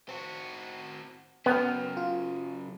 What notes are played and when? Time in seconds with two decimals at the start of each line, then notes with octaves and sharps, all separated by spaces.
0.09 C4 F#4
1.46 C#3 F#3 B3 F#5 G5 F6
1.97 F4